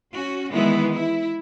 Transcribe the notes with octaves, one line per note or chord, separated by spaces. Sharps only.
C#4 F#4
D#3 E3 G#3 B3 E4
E4